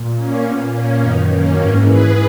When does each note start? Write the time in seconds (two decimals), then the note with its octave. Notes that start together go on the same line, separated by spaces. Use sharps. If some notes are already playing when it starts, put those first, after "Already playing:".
Already playing: A#2
0.16 A#3 C#4
0.44 A#2 B3
0.72 A#3 C#4
1.00 F#2 D#3 B3 D#4
1.30 A#3 C#4
1.57 G#2 E3 A#3 C#4
1.86 G#4 B4